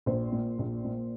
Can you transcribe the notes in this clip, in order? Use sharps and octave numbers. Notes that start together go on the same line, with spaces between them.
A#1 C5
A#2
A#1
A#2